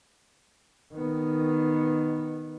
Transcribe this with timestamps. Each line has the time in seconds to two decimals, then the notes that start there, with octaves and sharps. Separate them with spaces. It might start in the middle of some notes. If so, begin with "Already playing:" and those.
0.93 D#3 B3